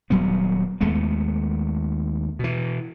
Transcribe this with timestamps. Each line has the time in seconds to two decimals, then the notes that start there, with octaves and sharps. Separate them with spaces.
0.10 D#1 F#3 G3 B3
0.81 D#2 G#3 A3 B3
2.39 B2 E3